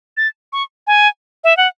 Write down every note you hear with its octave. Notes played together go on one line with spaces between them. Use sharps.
A6
C#6
G#5
E5
F#5